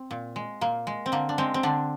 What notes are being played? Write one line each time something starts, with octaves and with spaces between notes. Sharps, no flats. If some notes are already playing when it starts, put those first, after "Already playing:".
Already playing: C4
A#2
G#3
A#2 A#3
G#3
C4
D3 A#3
D4
G#3 C4
C4
D3 D4